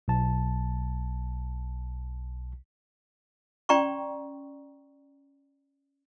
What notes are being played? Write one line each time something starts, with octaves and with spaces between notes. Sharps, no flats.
B1 A5
C#4 D5 G5 A#5 C6 C#6